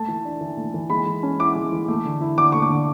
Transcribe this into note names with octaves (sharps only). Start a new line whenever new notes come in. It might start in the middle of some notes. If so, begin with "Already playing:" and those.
Already playing: A3 A5
E3
D4
E3
A3
E3
G#3 B5
E3
C#4
E4 D6
G#3
E3
A3
D3
E4
D3 D6
A3 C#6
D6
D3